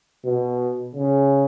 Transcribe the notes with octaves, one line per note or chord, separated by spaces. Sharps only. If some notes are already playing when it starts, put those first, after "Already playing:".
B2
C#3